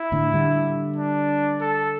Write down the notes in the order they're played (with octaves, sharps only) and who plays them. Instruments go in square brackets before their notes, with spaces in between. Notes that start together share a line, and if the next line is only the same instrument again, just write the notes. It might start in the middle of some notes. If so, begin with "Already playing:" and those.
Already playing: [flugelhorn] E4
[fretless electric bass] A2 D3
D3 G3
[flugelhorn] D4
A4